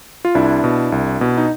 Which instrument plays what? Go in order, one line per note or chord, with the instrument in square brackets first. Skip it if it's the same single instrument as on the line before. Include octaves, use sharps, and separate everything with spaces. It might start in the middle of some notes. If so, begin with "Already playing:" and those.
[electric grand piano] F4
C2 D4 E4
B2
C2
B2
D#4